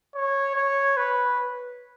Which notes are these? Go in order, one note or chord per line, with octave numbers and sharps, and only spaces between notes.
C#5
C#5
B4